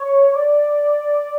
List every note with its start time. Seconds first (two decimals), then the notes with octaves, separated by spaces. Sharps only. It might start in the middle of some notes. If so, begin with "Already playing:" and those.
Already playing: C#5
0.34 D5